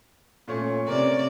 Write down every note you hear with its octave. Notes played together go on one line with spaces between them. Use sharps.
A#2 A3 C#4
C3 C#4 A#4 D5